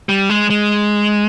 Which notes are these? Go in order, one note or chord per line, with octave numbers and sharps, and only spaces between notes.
G3
G#3
G#3